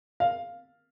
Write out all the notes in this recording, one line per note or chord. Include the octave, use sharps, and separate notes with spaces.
F5